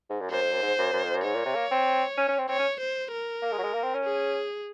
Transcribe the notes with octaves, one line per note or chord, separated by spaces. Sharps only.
G#2
F#2
F#2 C5
F2
F#2
G#2
F#2
F#2
F2
F#2
G#2 C#5
A#2
C3
A#3
C4
C#4
C#4
C4
C4 C#5
C#4
C5
A#4
A#3
G#3
F#3
G#3
A#3
C4
C#4
G#4